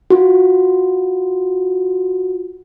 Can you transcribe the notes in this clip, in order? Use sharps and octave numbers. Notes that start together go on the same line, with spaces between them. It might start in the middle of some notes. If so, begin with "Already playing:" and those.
F4 F#4